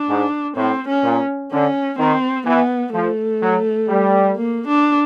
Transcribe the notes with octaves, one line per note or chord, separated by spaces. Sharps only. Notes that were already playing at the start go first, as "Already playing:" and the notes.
Already playing: D4
G#2
A2 C4
C#4
A#2
D3 C#4
D#3 C4
E3 B3
F3 A3
F#3
G3
A#3
D4